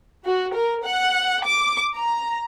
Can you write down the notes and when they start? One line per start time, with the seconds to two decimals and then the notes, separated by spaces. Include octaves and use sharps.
0.25 F#4
0.53 A#4
0.85 F#5
1.45 D6
1.98 A#5